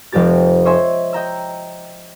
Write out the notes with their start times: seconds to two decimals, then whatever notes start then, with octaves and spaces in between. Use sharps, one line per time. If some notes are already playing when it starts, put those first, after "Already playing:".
0.12 F1 F2 G#3 G4 A6
0.65 C5 C#5 D#5 E5 G#5 C6
1.13 D#5 G5 A#5 E6